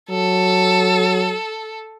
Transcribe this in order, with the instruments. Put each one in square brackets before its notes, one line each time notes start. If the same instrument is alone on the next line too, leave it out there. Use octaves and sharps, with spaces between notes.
[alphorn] F#3 [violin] A4